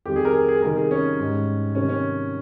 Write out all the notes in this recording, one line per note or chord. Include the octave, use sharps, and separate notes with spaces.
F2 D#3 G3 G4
G#4
A#4
G#4
G#4
C3 D#3 G3 A#4
G#4
C#4
G#2 G3
C3 D#3 G3 C#4
C#4